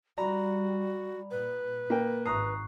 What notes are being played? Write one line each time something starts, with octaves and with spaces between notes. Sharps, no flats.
G3 F#4 D5 A#5 B5
A#2 B4
A#3 G5
G#1 G#2 A#5 C#6 D#6 F#6 C7